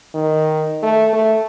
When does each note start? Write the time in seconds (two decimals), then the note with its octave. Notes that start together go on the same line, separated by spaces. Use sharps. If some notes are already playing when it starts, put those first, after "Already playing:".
0.15 D#3
0.83 A3
1.13 A3